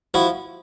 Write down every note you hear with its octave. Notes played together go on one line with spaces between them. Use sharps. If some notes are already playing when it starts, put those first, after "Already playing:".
F3 E4 F#4